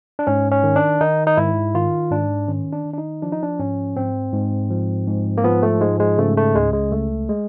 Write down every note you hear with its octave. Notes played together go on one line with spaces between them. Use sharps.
D4
G#2 C#4
C#4
D#3
D4
D#3 D#4
D#4
G#2 E4
D#3 F4
G#2 D4
D#3 C#4
D4
D#3
D4
D#4
F3 D4
D#4
D4
G#2 C#4
G#2 C4
G#2
F3
G#2
A#3
F3 B3
A3
G#2 G#3
G#3
C#3 A3
A3
C#2 G#3
G#3
C#2 A3
G#3